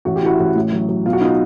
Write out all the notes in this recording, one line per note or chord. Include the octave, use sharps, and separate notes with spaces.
A1 F#4
G4
E3 E4 F#4
A1
A2
F#3
F#3
B2 F4
F#4
B3 D#4 F4